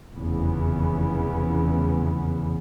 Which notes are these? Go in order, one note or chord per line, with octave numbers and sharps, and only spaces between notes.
F1 E2 C#3 E3 B3